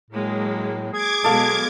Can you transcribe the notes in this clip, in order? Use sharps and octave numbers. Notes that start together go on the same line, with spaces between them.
A2 F#3 G#3 A#3
G#4 D6 G#6
B2 F#3 G#3 A4 F5